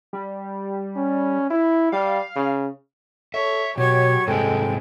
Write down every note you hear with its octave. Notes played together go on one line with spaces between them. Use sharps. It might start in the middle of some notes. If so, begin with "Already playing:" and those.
G3
C#4
E4
G3 F5
C#3
A4 C#5 E5
B2 F#3 G4 C#5 C#6 G#6
G#2 C3 G3 G#3 A4 G5